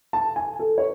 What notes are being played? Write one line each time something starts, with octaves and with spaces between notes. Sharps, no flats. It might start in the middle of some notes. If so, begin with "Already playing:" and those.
A5
G#5
A4
C#5